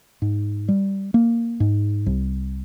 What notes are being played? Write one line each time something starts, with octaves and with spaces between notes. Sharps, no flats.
G#2
G3
A#3
G#2
C2